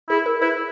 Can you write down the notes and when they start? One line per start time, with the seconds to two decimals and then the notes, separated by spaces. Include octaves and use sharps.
0.09 E4 G#4
0.26 A#4
0.42 E4 B4